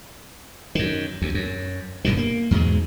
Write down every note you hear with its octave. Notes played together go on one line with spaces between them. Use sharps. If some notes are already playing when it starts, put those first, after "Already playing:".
F#2 D#3
D2
F#2
F#1 G2 B2 D#3
A#3
E2 G#2 B2 G#3